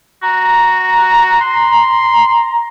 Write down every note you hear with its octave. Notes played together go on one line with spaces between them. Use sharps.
F#4 A#5
C6